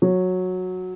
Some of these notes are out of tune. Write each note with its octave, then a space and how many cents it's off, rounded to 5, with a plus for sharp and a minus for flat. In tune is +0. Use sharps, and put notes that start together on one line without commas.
F#3 -10